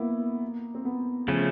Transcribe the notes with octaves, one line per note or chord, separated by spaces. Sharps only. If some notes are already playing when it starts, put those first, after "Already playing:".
Already playing: A#3 B3 E4
C4
B3
C#3 F3 A3 C#4